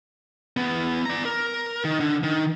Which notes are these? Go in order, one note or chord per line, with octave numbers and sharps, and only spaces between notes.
E2 B3
D5 A#5
A#4
D#3
D3
D#3